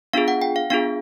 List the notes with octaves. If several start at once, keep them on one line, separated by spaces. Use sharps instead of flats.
B3 D4 F4 G#4 F5
F#5
G5
F5
B3 D4 F4 G#4 F5